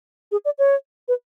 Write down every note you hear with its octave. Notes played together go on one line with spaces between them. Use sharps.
G#4
D5
C#5
B4